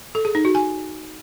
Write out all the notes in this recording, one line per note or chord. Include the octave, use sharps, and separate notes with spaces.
A4
G#4
D#4
F#4
G#5